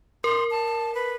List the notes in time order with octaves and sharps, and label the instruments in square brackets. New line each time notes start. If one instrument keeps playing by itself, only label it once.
[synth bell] A#4 [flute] C6
[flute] A5
B4